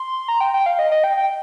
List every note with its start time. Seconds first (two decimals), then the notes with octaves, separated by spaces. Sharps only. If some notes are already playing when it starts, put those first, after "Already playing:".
Already playing: C6
0.28 A#5
0.41 G5
0.54 G5
0.66 F5
0.79 D#5
0.92 D#5
1.04 G5
1.17 G5